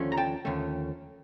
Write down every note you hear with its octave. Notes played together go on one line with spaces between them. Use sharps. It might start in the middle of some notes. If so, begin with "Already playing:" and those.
Already playing: D#2 D3 F3 A3 C#4
A#5
G5 A5
D#2 D3 F3 A3 C#4